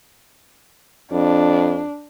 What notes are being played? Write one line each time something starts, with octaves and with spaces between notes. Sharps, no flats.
F2 D4